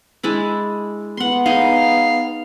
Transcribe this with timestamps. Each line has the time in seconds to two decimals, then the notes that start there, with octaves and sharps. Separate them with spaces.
0.23 G#3 D4 E4
1.17 B3 F#5 C6
1.46 D#4 G#4 F5